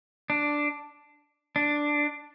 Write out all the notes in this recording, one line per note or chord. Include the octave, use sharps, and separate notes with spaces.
D4
D4